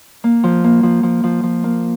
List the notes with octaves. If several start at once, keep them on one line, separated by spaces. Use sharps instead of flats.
A#3
F3
A#3
F3
F3
F3
F3
A#3